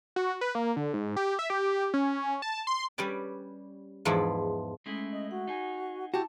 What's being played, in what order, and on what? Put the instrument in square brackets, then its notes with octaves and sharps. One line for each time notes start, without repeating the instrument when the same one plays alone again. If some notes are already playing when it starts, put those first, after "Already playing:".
[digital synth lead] F#4
B4
A#3
D3
G#2
G4
E5
G4
C#4
A5
C6
[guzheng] G3 C#4 G4 B4 D5
E2 G#2 F3 E4 D5
[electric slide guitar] G#3 A3 E4 [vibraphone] C#4
[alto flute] D#5
[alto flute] F#4 [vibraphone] F#5
[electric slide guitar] D#4 G#4
[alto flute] E4 [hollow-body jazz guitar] F#4 G4 [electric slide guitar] A5